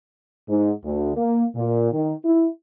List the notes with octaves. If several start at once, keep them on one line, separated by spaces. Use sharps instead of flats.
G#2
D2
A#3
A#2
D#3
E4